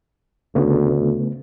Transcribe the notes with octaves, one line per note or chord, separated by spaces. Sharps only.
D2 C#3 A3 B3